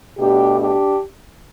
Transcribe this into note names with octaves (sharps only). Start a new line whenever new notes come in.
B2 A3 D4 G4
D4 G4